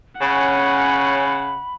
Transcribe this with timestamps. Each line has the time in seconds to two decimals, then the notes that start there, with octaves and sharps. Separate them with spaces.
0.21 C#3 C#4 F#5 B5